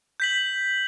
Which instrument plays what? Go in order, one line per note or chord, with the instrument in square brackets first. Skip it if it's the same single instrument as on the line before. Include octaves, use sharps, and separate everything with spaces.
[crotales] G6 B6 F#7